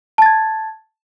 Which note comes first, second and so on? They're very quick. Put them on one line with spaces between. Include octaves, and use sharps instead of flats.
A5 A6 G#6